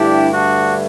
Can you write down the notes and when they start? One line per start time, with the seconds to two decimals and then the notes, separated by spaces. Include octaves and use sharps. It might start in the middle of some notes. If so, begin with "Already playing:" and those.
Already playing: G2 D3 A3 D4 E4 G4
0.32 D4 F#4